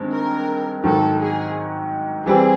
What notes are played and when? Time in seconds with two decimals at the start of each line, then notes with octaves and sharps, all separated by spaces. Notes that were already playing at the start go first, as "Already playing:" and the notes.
Already playing: G2 D#3 G#3 C4
0.13 A#4
0.84 G#2 D#3 F#3 A4
1.19 G#4
2.26 E3 G3 C4 G#4